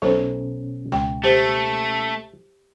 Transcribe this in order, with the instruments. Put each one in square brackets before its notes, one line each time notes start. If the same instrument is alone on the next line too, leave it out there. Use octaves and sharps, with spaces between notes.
[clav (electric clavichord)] B1 C#5 [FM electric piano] B2 C#4 [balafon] A4 C5
[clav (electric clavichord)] C#2 [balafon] G5
[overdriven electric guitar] A3 [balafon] G4 C5